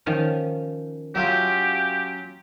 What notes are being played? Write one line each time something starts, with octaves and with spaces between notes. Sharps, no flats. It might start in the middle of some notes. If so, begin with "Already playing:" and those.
D#3 F3 C#4
F#3 C#4 F4 G4 E5